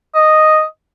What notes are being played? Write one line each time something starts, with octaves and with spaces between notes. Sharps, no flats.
D#5